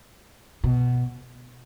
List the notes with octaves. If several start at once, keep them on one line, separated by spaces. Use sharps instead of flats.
B2